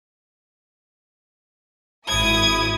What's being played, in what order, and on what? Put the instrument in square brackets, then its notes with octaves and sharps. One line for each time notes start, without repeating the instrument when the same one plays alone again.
[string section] G#1 E4 D#6 [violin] G#6